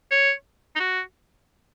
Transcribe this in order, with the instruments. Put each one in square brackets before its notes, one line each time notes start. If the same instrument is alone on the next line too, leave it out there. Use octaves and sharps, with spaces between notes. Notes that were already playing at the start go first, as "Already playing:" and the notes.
[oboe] C#5
D#4
F#4